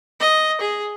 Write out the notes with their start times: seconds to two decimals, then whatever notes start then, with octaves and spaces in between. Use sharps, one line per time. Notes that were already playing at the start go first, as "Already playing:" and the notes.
0.20 D#5
0.61 G#4